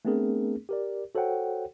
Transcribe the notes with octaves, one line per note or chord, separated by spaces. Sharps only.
A3 B3 C4 D4 G#4 A#4
G4 A#4 D5
F#4 A4 C5 C#5 F#5 G5